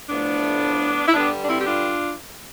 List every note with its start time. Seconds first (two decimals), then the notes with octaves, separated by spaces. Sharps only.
0.09 A2 F3 A3 B3 D4
1.06 E4
1.12 G2 D3 G3 B3 D4
1.42 D4
1.47 C4 E4
1.58 G4
1.64 D4 F4